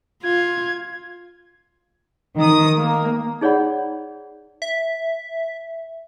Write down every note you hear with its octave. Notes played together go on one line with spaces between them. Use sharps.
F4 G#6
D#3 D#6
A#3
D#4 G#4 C#5 D5 F#5 B5
E5